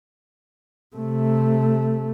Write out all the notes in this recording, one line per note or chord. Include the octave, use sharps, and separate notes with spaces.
C3 A3